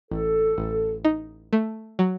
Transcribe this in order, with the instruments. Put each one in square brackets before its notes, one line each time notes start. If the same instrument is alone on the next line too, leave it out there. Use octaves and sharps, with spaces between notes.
[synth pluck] A1 [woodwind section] A4
[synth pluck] A1
D#4
A3
F#3